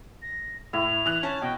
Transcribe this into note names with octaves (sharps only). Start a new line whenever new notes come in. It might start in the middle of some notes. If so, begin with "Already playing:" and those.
A#6
A2 E4 F7
E3 F#6
C#4 A5
B2 G5